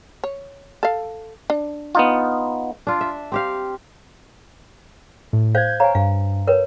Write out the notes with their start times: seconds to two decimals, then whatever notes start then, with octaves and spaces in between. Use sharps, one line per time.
0.24 C#5
0.83 A4 F5
1.50 D4
1.95 B3 D#4 F4
2.87 D4 F4
3.01 E5
3.32 C4 G4 F5
5.33 A2
5.55 C5 F5 G6 G#6
5.80 C#5 F5 G#5 A#5
5.95 G2 F5
6.47 A#4 B4 C#5